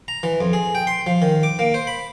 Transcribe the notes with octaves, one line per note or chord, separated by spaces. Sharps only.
A#5
E3
F2
G#4
G5
C6
F3
D#3
D6
A#3
C5
B5